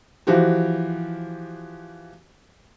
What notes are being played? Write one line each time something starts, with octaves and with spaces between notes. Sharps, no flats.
E3 F3 F#4 G4